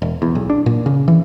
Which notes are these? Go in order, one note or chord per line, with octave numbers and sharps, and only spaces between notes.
E1
E2
B1
D4
A#2
C#3
E3